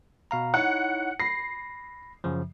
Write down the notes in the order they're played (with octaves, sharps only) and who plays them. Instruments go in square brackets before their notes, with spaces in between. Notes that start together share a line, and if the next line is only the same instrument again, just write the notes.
[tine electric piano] B2 F5 A#5
[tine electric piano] D#4 E4 C#5 [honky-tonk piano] F#5
[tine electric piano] B5 A#6 [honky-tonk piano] C7
[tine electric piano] F#2 C#3 F3